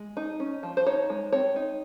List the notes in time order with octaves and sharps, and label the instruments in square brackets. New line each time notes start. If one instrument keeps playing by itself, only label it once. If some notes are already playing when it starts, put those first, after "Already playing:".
Already playing: [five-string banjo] G#3
D#4
C#4
F3
C5
D#4 C#5
G#3
C4 C#5
D#4